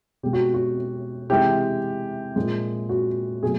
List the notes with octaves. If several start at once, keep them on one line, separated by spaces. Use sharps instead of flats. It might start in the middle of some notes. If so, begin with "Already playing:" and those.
B2 G#3 G4
F#4
F#4
C3 E3 G#3 G4
A#2 F3 G#3
F#4
B2 F#3 A3 G#4